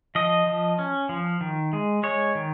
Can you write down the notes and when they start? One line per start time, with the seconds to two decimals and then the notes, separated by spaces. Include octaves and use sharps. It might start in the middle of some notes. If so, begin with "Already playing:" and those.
0.15 F3 D#5
0.47 F3
0.79 C#4
1.09 F3
1.41 D#3
1.73 G#3
2.03 G#3 C#5
2.35 D#3